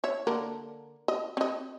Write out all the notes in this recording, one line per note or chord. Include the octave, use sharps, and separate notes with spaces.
C#5 E5
D3 A#3 A#4
D#5
C4 D#5